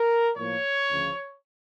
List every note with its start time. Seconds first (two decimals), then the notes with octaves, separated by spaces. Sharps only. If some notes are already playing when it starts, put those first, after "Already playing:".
Already playing: A#4
0.36 A2 F3 A#3 C#5
0.90 D2 C#3 F3